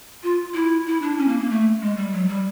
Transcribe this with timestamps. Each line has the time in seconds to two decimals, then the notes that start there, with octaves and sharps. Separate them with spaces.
0.23 F4
0.54 E4
0.86 E4
1.02 D4
1.18 C#4
1.28 A#3
1.40 A#3
1.50 A3
1.81 G#3
1.97 G3
2.13 F#3
2.29 G3